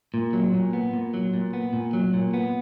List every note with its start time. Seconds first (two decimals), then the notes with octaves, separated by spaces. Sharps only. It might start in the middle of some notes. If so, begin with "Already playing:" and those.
0.14 A#2
0.33 F#3
0.54 A#2
0.73 B3
0.93 A#2
1.14 F#3
1.34 A#2
1.53 B3
1.73 A#2
1.93 F#3
2.13 A#2
2.34 B3